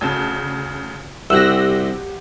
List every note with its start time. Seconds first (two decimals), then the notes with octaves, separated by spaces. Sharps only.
0.01 D2 C#3 A5
1.30 C2 F#4 G4 E6 F#6 A#6